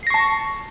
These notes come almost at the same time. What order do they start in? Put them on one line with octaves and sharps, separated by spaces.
C7 A#6 C#6 A5